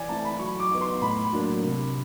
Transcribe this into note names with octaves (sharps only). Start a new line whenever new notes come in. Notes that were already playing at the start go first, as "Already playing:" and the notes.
Already playing: E3 D5 G#5
A3 C4 E4 A5
B5
F#3 C#6
D6
B3 D#4
C6
A2 B5
F#3 A#3 D4
C3